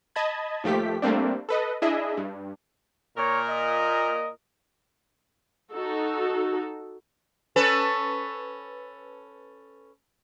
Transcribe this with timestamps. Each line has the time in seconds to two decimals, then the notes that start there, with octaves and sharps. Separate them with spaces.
0.16 D#5 A5 B5 G#6
0.64 D#2 F3 A3 G4 B6
1.02 G3 A3 A#3 C4 D4
1.49 A4 B4 D#5
1.82 D4 E4 G#4 D#5 E5
2.17 G2
3.18 A#2 A#4 C#5
3.49 D#5
5.72 D#4 F#4 A4
7.56 C#4 A4 B4